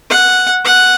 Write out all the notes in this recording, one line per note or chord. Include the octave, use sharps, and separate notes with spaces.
F#5
F#5